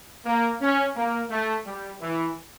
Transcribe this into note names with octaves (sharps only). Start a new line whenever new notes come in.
A#3
C#4
A#3
A3
G3
E3